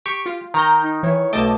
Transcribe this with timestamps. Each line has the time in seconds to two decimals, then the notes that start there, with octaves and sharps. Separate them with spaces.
0.06 G4 C#6
0.26 F4
0.54 D#3 A#5 G6
0.83 D#4
1.03 E3 C#5
1.33 B1 A3 D#5 G5 A5 D6